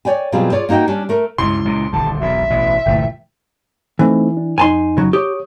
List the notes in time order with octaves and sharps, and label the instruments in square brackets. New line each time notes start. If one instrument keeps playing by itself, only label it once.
[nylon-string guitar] C#5 D5 G5 G#5
B2 F#3 G3 C4 F4 G#4
F4 G#4 C#5 D5
A#3 D#4 F#4 D#5 G5
G3 C#4 D4
A3 A#4
[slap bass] C#2 G2 C3 [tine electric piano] G#3 E4 [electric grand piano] C6
[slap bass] C#2 A#2
[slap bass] D#1 D3 G3 [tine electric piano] C2 [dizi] A5
[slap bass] E1 B1 E3 [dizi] E5
[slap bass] A1 B2 E3
[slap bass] G1 D2 A3 [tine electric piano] A#2 E3 G5
[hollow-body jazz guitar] E3 [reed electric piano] A3 C4 D#4
[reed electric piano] D4
[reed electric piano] F2 D#4 [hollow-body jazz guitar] G#5 A5 C6
[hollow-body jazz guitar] C#3 F#3
[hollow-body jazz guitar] G4 [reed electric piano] C#5 D#6